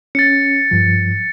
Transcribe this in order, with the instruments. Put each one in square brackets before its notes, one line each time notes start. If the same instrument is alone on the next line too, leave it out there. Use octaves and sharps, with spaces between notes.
[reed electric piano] C#4 [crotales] A6 C#7
[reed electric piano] G2 F3